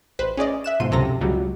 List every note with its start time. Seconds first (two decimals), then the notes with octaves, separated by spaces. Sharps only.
0.19 A1 B4 C5
0.37 C#4 G#4 D5 D#5
0.64 E5 F#6 E7
0.80 G#2 B2 F3 C6 D#7
0.91 C#2 F#2 C3 A4 A#5 A#6
1.21 C#2 F#3 G3